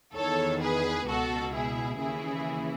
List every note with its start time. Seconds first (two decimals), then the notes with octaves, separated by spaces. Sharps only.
0.14 E2 D#3 A4 C#5
0.61 G#4 B4
1.07 C#2 B2 F#4 A4
1.53 E4 G#4
2.00 D#2 C#3 E3 E4 G#4